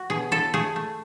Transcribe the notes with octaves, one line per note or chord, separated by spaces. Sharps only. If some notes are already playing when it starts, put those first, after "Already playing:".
Already playing: F#4
B2 G#4
E4 A4
A3 G#4
A3